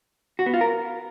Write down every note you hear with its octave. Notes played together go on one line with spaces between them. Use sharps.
F#4
B3
F4
A#4